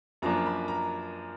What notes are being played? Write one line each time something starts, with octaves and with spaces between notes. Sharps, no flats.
F#2 F3 A#3 D4 A#5
B5
A#5